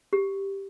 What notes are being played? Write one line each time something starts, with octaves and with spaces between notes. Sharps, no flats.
G4